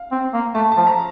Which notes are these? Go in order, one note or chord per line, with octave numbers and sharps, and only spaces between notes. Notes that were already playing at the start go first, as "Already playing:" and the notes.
Already playing: F5
C4
A#3
A3 A5
A5
F3
A#5